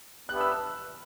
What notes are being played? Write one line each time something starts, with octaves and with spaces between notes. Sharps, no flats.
B3 D4 G4 B4 E5 F#6
E6
E6